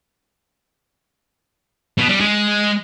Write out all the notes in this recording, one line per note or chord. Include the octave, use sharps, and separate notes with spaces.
B2
G3
G#3